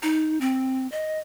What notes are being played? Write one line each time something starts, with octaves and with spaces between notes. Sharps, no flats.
D#4
C4
D#5